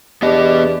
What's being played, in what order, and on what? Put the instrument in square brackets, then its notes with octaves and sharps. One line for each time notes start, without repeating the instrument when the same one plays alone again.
[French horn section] E2 [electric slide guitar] B3 D#5 [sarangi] D4 [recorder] G4